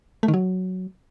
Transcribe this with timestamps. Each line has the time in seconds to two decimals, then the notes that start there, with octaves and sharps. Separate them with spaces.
0.23 A3
0.28 D#3
0.34 F#3